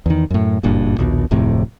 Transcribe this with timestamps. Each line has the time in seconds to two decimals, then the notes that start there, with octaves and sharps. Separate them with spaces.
0.06 E2 D#3
0.30 F#2 A2
0.63 F#1 G2 A#2
0.99 A#1 D#2 B2
1.31 D1 F2 A2 C3